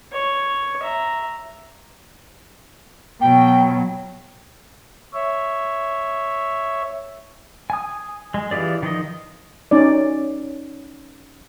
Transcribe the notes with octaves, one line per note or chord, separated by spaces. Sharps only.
C#5
E5 A#5
B2 F#3 G5
C#5 E5
G#5 D#6
G#3
E3 F4 G4 G#4 D5
D#3 F3 D#5
C#4 D#4 D5